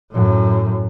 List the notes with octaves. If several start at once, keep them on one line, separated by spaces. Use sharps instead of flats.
F#2 A2